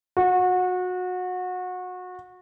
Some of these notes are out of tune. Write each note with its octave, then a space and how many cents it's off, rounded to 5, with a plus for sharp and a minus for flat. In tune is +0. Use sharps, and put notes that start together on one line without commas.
F#4 -25